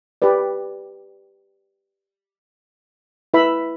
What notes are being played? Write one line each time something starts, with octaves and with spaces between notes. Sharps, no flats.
G4 B4 D5
E4 B4 E5 B5